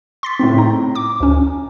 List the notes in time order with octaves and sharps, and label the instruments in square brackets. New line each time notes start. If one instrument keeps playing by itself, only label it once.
[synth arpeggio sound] C6 A6 B6
[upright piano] A2 C4
[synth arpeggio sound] D#4 [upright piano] A#5
[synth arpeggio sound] D6
D2 C#4